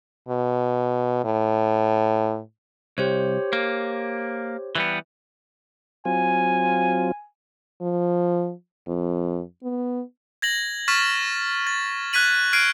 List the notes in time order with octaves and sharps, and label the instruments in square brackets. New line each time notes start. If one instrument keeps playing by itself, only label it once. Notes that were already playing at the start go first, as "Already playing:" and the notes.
[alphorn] B2
A2
[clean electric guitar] C2 [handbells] G4 C5 C#5
[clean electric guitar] A#3
E3 G3 B3
[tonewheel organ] F#3 C4 F4 [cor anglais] G#5
[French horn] F3
F2
B3
[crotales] G#6 A#6 F#7
C#6 F6 A6 B6 E7
A6
F#6 G#6 B6 D#7 F#7
F6 F#6 G#6 C7 D7 D#7